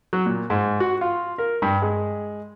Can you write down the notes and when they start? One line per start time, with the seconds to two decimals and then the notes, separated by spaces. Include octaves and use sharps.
0.13 F#3
0.26 A#2
0.50 G#2
0.80 F#4
1.01 F4
1.38 A#4
1.62 G2
1.82 G#3